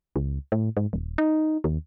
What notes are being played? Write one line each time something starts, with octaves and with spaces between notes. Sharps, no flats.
C#2
A2
G#2
D#1
D#4
D#2